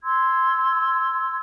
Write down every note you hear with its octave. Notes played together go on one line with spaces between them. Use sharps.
C6 E6 G#6